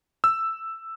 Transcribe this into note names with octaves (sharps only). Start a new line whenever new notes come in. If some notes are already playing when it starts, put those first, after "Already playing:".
E6